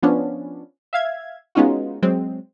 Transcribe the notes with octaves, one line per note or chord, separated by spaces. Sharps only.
F3 B3 C#4 D4
E5 F5 G#6
G#3 B3 C#4 D#4 F4 F#4
F#3 G#3 C4